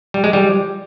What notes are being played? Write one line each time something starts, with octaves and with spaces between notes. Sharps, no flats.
G3
G#3
G3